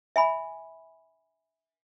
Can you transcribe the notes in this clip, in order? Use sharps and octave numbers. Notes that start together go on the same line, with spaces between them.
E5 G#5 B5